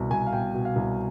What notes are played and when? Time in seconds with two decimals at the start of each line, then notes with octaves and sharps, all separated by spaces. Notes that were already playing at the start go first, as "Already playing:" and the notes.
Already playing: C2 B2
0.11 C2 G#5
0.27 F5
0.33 B2 G5
0.54 B2
0.65 F5
0.76 C2